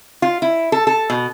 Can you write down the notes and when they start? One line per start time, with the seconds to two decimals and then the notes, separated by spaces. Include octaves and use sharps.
0.22 F4
0.42 E4
0.72 A4
0.87 A4
1.10 B2